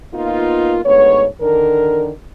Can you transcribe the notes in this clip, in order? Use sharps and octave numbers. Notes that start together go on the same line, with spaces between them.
A#3 B3 D#4 F4
D2 G#2 B3 C#5
D3 D#3 D4 A#4